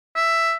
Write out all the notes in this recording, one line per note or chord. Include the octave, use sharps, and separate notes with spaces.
E5